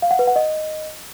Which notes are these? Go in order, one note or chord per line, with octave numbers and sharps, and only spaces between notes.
F5
F#5
B4
F#5
D#5